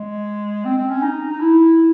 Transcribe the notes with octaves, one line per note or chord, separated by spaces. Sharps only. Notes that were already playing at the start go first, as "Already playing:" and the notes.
Already playing: G#3
C4
C4
C#4
D#4
D#4
E4